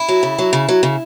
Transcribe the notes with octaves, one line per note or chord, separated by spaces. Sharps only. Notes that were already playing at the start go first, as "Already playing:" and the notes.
Already playing: E4
F#3
C#3
F#3
C#3
F#3
C#3